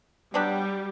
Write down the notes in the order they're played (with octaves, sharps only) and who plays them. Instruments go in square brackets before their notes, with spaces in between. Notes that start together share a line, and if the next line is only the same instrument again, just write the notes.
[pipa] F#3 B3 D4 G4 [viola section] G3